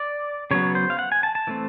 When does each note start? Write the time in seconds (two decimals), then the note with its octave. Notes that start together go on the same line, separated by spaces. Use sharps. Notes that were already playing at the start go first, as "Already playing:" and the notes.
Already playing: D5
0.51 C#3 F#3 B3 C#5
0.75 C5
0.90 F5
0.99 F#5
1.12 G#5
1.23 A5
1.35 A5
1.47 E3 A3 C4